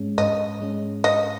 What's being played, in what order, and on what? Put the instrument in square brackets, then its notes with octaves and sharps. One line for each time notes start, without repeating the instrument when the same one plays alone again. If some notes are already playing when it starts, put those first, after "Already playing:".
Already playing: [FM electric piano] G#2 G#3 C#4
[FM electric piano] G#2 [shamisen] D#5
[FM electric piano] G#3 C#4
[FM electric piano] G#2 [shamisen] D#5